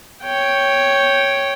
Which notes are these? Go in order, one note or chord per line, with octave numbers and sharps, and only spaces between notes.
C#5 G5